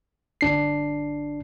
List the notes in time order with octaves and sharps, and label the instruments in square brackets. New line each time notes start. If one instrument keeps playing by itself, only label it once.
[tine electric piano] G1 D4 C7